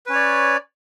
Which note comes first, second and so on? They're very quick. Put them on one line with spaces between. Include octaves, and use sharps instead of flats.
B4 C#4 C#5 D5